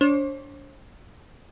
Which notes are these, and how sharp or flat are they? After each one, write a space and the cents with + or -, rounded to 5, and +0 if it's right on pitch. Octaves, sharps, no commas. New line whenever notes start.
D4 -30 C5 +45